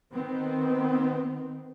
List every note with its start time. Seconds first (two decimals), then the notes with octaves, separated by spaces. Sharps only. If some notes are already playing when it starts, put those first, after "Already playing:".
0.13 D#3 B3 C4